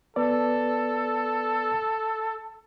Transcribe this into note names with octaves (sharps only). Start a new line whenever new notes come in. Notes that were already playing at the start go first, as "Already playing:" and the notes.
B3 A4 B4 D5